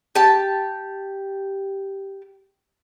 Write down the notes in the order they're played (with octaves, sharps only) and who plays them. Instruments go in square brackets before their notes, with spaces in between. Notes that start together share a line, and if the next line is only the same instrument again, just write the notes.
[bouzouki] G4 A5